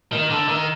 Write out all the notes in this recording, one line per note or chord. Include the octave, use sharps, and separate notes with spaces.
D#3
D3
D#3